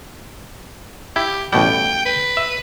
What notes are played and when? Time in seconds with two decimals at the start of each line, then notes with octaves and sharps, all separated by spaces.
1.16 E4 G4
1.53 A1 B2 G3 G5
2.06 B4
2.37 E5